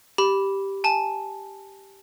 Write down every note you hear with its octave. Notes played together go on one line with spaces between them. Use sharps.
G4 B5
G#5 A5